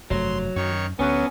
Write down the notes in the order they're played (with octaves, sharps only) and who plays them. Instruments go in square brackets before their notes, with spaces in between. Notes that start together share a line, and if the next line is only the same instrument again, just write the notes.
[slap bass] F1 G2 A3 [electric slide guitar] F#3 [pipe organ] C6
[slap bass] F#2 [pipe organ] D#3 C#5 C#6
[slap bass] D2 D3 [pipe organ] F#3 [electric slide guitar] B3 [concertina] C#4